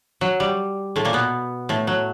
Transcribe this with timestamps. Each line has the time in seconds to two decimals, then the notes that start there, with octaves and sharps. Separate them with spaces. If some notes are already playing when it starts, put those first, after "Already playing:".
0.21 F#3
0.40 G3
0.96 A2 A3
1.05 A#2 A#3
1.13 B2 B3
1.69 A2 A3
1.87 F#3